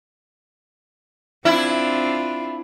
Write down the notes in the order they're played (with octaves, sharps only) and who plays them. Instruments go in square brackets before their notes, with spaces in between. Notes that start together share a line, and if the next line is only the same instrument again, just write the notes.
[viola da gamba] C4 D4 F4 [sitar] E4